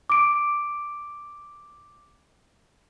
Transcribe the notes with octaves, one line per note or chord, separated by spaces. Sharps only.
D6 D7